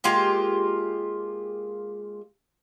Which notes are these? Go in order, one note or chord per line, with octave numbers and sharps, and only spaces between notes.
G#3 A#3 F4 G4